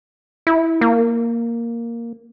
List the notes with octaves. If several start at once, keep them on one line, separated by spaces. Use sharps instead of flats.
E4
A#3